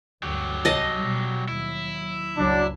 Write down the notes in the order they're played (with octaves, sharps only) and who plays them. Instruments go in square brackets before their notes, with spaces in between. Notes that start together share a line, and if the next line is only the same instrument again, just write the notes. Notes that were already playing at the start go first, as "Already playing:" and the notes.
[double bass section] D2 G2 [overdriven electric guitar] F#3 G4
[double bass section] C2 [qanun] D#5 A5
[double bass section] B2 G3
[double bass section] D#2 F#3 [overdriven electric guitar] E4
[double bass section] F#1 C#2 [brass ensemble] F#3 D4